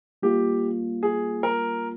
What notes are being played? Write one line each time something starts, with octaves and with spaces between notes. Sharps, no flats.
G3 A#3 F4 G4
G#4
A#4